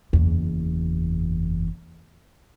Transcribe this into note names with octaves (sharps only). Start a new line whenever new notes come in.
F#1 E2